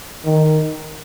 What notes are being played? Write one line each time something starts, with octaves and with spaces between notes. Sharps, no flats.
D#3